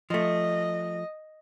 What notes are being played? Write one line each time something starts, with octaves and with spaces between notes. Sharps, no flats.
F3 A3 D#5